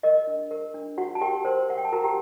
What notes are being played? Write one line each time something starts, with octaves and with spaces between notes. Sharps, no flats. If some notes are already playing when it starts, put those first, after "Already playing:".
A#4 D#5
D4
A#4
D4
F#4 F#5
A5
G4 A#4 G5
A#4 C5 C6
A#4 F#5
G5
A5
F#4 A#4 A#5
G4 G5